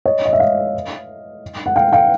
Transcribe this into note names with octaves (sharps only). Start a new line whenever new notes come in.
C#5 D#5
D#5
E5
D#5 F5
F#5
F5 G5
F5 G5